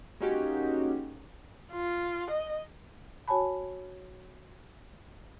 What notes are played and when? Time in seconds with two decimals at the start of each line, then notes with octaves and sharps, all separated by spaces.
0.20 G#3 A#3 C#4 D#4 F#4 G4
1.72 F4
2.31 D#5
3.28 F#4 C#5 G#5 A5 B5